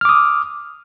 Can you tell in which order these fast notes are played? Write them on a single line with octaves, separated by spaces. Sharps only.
F6 D6 D#6